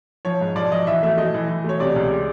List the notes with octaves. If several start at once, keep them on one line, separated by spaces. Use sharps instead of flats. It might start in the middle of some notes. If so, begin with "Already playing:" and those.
F3 C#5
G#2
F3 D5
F3 D#5
E3 E5
A3 E5
A3 D#5
E3
E3
A3 C#5
C3 D5
C#2
G#3